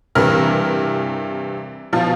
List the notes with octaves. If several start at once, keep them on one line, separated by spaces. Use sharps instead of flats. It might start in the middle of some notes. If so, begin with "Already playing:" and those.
G2 C3 E3 A#4 F6
B2 F3 F4